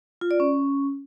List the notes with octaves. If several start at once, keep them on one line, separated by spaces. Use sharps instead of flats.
F4
D5
C#4